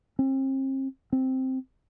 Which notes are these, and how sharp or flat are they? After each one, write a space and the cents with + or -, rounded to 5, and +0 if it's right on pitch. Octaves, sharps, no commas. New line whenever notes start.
C4 +40
C4 +0